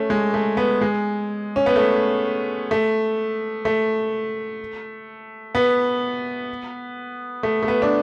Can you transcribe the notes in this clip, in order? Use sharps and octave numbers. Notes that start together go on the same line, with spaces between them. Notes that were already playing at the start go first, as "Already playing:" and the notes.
Already playing: A3 C#4
G#3
A3
B3
G#3
C#4
B3
A3
A3
A3
B3
A3
A3
B3
D4